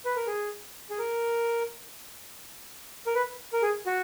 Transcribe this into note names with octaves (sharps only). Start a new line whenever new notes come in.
B4
A#4
G#4
G#4
A#4
A#4
B4
A#4
G#4
F#4